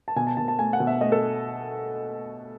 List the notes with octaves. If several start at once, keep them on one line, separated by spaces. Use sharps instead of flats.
A5
B2 G#5
A5
B2 A5
A5
A3 G#5
F#5
B2
E5
A3 D#5
A4